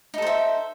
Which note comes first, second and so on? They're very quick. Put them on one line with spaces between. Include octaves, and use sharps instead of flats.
D#4 A4 C5 E5